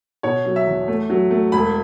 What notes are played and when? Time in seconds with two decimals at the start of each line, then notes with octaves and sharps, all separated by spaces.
0.23 B2 C#5
0.46 F#3
0.56 E5
0.67 E2
0.88 A3
1.10 F#3
1.31 A3
1.52 E1 B5